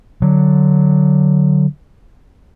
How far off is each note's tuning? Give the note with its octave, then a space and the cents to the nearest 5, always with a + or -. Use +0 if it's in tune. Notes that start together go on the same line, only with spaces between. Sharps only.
D3 +0 F#3 +0